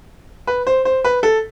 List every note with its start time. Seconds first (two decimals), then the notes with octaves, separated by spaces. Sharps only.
0.47 B4
0.67 C5
0.85 C5
1.04 B4
1.23 A4